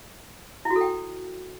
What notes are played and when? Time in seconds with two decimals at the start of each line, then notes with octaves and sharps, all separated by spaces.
0.65 E4
0.70 F#4
0.76 A4
0.81 G5